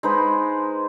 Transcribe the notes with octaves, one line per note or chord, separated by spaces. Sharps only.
G#3 D#4 B4 C5